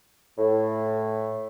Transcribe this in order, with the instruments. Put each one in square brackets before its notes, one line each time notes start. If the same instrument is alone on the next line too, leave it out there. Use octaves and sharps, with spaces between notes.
[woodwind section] A2